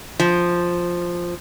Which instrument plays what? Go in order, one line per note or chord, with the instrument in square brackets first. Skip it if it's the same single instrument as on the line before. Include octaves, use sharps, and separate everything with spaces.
[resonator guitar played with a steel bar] F3